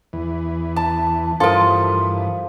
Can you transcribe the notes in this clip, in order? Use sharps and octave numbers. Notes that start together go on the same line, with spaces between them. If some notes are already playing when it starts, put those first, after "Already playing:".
E2 E3
A5
G2 E3 F3 A4 A#4 D#6